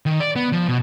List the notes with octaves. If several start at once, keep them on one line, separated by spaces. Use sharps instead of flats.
D#3
D5
B3
F3
B2